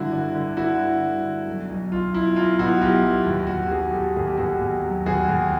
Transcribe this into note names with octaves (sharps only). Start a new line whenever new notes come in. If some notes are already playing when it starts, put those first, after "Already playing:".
Already playing: G2 D3 E4 F#4
D3
D3
D3 E4 F#4
G2
G2
D3
B1
B1
B1 F4
B1 E4
B1 F4
B2 E4 F#4
B1 F4 G4
B1
D#2
D#2 F#4
G4
F#3 F#4 G#4
D#2 G4 A4
D#2 G#4
G4
D#2 F#4 G#4
D#2
F#3
D#2 F#4 G#4
D#2